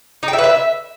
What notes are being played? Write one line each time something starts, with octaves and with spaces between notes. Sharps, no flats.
D#4
G5
E5
B4
E5